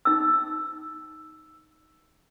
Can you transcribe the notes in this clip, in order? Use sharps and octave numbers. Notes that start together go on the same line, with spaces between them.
D#4 E6